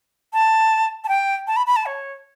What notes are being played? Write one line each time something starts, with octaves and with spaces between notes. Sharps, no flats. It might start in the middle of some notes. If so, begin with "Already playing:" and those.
A5
A5
G5
A5
B5
B5
A5
C#5